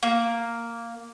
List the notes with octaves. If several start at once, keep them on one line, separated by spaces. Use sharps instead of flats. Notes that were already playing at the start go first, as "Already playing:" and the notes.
A#3